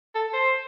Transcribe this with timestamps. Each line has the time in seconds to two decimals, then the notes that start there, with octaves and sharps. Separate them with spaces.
0.15 A4
0.33 C5